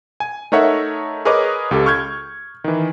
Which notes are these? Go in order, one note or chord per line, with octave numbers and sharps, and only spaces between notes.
G#5
A3 D#4 A#4 C#5 E5 F#5
G#4 A#4 B4 C#5 D#5 D6
C#2 G4 A4
C#6 F6 G6 G#6
D#3 E3